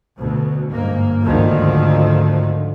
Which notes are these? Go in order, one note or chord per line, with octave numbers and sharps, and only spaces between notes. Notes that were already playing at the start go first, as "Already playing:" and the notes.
D2 B2
G1 G#2 A#3
G#1 D2 G#2 D3 D#3 F3